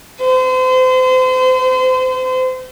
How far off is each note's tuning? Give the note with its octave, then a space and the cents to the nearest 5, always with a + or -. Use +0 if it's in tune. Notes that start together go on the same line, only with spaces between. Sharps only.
C5 -35